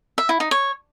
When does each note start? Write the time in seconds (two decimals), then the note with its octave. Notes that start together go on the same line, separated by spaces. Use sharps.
0.18 E5
0.29 E4
0.40 D#4
0.51 C#5